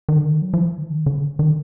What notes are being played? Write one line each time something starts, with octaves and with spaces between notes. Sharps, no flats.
D#3
D3
D#3
F#3
F3
E3
D3
D#3
D3
D#3